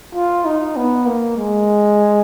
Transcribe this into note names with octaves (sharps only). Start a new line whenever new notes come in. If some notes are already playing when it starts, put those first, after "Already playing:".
F4
D#4
B3
A#3
G#3